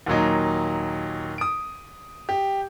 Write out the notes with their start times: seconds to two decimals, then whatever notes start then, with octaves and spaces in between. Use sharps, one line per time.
0.06 D#2 A#2 F#3 D#4
1.38 D#6 D7
2.29 G4